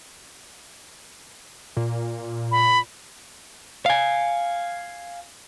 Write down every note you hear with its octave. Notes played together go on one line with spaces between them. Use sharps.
A#2
B5
F5 G#5